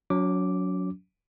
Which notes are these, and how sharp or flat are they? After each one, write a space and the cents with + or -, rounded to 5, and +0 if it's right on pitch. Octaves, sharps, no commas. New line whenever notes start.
F#3 -10 C#4 +40 D6 +0